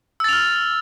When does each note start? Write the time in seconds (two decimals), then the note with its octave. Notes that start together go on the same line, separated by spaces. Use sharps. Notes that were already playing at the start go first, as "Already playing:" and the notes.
0.20 E6
0.24 A6
0.29 F7
0.33 F6